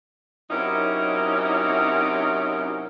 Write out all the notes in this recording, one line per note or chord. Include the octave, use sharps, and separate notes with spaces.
C3 F#3 C#4 D#4 E4 A#4